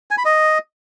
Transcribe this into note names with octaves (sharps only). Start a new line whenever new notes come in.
G#5
B5
D#5